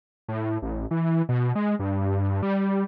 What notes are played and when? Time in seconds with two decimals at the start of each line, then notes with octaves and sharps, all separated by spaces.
0.28 A2
0.62 A1
0.91 E3
1.29 B2
1.55 G#3
1.79 G2
2.42 G3